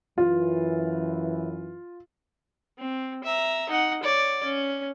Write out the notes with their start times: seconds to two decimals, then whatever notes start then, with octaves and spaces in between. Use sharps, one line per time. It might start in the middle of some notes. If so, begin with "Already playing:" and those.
0.18 F#2 E3 F4
2.78 C4
3.24 E5 A#5
3.69 D#4 F#5
4.03 C#5 D5
4.44 C#4